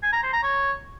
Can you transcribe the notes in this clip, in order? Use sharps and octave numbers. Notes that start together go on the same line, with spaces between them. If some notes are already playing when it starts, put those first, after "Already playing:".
G#5
A#5
C5
A#5
C#5